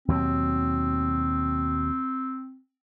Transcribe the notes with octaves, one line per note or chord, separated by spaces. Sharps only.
D#2 B2 F#3 C4